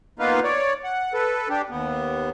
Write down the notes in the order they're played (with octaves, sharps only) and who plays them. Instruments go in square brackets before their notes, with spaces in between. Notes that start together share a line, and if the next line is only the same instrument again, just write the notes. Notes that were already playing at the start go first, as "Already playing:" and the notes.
[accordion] A#3 B3 D#4 F4 B4 F5
C#5 D5
F#5
A4 B4
D4 G4
D#2 B3